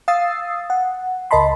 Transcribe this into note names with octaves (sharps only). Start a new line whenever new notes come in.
F5 D#6 E6 A6 C7
F#5
C#2 A#4 D#5 A5 B5 C6